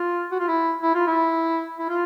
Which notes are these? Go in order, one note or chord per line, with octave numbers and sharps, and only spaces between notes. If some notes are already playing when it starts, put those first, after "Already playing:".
Already playing: F4
F#4
F4
E4
E4
F4
E4
E4
F4